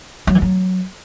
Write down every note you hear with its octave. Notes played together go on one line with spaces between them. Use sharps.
F#3
E3
F#3